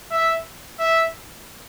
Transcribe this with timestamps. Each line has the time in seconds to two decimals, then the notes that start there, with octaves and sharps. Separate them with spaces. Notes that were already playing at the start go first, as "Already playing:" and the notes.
0.11 E5
0.79 E5